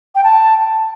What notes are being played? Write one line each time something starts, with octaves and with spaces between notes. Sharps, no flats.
G5
A5